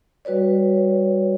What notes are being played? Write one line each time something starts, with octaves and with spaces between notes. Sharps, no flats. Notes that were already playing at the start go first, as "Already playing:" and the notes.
G3 F#4 B4 C#5 D5